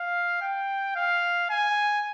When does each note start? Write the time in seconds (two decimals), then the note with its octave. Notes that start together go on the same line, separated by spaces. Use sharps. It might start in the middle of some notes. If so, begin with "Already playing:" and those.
Already playing: F5
0.41 G5
0.96 F5
1.50 G#5